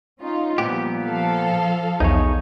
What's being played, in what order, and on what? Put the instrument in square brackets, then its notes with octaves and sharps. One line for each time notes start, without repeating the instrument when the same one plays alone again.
[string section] C#4 D#4 F4
[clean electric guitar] A#2 B3 G4 [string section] F3 G3
[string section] F3 A4 F5
[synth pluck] B1 E2 [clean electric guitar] D#4 G#4 C#5